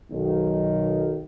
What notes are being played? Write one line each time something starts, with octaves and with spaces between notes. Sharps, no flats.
B1 D#3